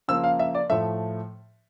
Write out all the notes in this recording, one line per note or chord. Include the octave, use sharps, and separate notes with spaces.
C#3 F3 A#3 E6
F5
E5
D5
A2 F3 A3 E5